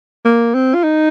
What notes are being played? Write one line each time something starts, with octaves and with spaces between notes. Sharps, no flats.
A#3
C4
F4
D#4